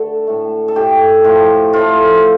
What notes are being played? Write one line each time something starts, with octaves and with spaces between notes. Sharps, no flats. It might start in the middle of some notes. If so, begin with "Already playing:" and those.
Already playing: D3 A3 A4
A2 A3
A4
A2 A3 G4
A2 F3 A3
A2 F3 A3 F4